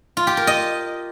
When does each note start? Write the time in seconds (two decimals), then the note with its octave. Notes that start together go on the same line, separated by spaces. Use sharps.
0.17 F4
0.27 G4
0.37 A#4
0.47 D#5